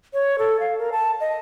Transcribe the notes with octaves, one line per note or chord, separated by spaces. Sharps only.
C#5
A4
F5
A#4
A5
D#5